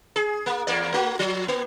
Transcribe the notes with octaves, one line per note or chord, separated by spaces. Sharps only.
G#4
A#3
E2 A#3 D5
A3 F#4
F3
A#3